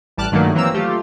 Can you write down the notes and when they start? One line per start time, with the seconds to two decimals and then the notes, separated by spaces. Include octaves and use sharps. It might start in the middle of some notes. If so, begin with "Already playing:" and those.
0.17 A1 G3 A5 D6 F6 F#6
0.32 G2 A#2 D#3 F#3 A3 A#3
0.55 E3 F#3 A#3 C4 A#5 E6
0.74 A3 F4 G4